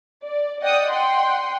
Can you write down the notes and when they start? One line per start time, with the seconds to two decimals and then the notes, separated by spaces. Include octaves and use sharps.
0.22 D5
0.61 D5 D#5 F#5 G5 D#6
0.91 F#5 G5 C6